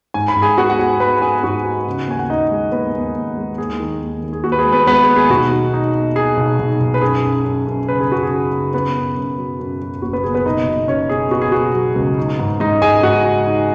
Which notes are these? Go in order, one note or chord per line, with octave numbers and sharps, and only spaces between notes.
G#2 G#5
B5
G#2
G#4 G#5
B3 F#4 F#5
F#5
B3 G#4 G#5
G#3 B4 B5
F#5
B3 G#4 G#5
G#2 F#4 F#5
D#4
C#3
D#2 G#5
F#5
D#4 D#5
G#3
D#2 B3 B4
D#2
D#2
G#3
D#2 G#4
D#3
D#2
D#2
G#4
D#2 F#4
B4
G#4
G#3
B3 B4
G#3 B3 B4
G#4
D#2
G#4
B1 F#4
D#4
D#4
D#4
D#4 G#4
B1
B1
B1
B4
F#2 G#4
F#2
F#2
F#2
C#3 B4
G#4
F#2 F#4
G#4
C#3
C#3
C#3 B3 B4
F#2
F#2
F#3
F#2
F#3
F#1 F#4
B3 B4
F#1 G#4
B3 B4
B2 D#4 D#5
B2
B2 C#4 C#5
B3 G#4
B3 F#4
G#4
B2 F#4
F#3
C#2
D#4
G#2
G#2 D#4 D#5
G#2 G#4 G#5
G#2 F#4 F#5
D#4
D#4